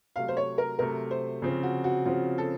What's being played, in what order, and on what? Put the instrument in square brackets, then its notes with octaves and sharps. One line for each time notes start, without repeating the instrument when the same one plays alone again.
[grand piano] C3 F#3 A3 [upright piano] F5
[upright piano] C5
C#5
A#4
[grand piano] C3 F#3 A3 [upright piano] A#4
[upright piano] C5
[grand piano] C#3 F3 C4 F4
[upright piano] F#4
F#4
[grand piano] C#3 F3 C4 F4 [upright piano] F#4
[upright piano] A4